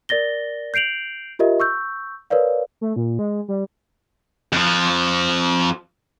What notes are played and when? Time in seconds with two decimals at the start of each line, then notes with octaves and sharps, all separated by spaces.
0.09 A#4 D5 A6 A#6 G7
0.74 G6 C7 D7 F7 F#7
1.39 F4 G4 A#4 D#5 E5
1.60 C#6 E6 G6
2.30 A#4 B4 C#5 D5 F5
2.81 A3
2.96 A#2
3.19 G#3
3.48 G3
4.52 F2 F3